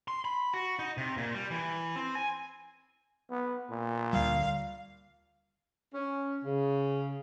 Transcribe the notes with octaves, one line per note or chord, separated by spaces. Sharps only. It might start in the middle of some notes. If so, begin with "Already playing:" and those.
C6
B5
F#4
D#4
C3
A#2
G3
E3
C4
G#5
B3
A#2
D2 G3 F5
C#4
C#3